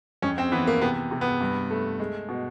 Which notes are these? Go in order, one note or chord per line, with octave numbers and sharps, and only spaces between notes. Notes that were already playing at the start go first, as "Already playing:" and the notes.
F2 C#4
C4
E3 B3
A#3
C3 B3
C3
B3
G2
A3
G#3
B2